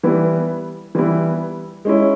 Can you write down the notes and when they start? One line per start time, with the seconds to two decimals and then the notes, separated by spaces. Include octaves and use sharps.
0.03 E3 G3 B3 E4
0.95 E3 G3 B3 E4
1.85 G#3 C#4 E4